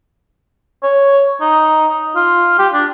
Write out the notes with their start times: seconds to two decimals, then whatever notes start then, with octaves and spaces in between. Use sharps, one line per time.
0.83 C#5
1.41 D#4
2.16 F4
2.59 G4
2.73 D4